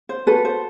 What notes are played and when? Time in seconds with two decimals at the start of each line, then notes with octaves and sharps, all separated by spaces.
0.09 C5
0.26 F#4 A4 B4
0.45 C5